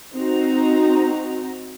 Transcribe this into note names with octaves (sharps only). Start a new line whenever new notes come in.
C4 D#4 F#4 A#5